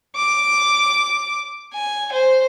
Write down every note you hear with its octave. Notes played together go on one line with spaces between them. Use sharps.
D6
G#5
C5